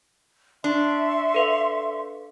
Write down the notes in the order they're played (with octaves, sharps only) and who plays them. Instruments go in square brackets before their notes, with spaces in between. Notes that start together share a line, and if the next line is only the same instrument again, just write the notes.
[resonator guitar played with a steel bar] D4 [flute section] E5 C6 C#6
[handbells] A4 B4 F5